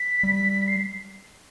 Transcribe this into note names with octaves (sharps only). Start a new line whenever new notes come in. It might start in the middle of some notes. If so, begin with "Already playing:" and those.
Already playing: B6
G3
C7